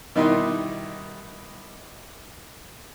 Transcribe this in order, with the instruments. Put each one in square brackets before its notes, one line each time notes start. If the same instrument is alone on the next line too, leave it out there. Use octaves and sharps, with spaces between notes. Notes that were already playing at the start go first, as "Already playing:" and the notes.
[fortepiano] B2 D#3 G3 D#4 E4 C6